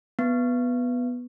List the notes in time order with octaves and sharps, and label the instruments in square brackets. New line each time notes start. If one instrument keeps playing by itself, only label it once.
[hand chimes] B3